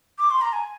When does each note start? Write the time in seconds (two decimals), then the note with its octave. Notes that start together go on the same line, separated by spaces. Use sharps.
0.18 D6
0.30 C6
0.41 A#5
0.53 G#5